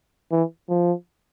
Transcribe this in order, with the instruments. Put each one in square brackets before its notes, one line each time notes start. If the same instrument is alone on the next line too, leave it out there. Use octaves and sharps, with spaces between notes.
[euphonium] E3
F3